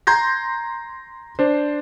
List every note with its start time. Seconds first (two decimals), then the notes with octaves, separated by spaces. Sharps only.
0.07 A#5 C6 G6 G#6 A#6
1.39 D4 C5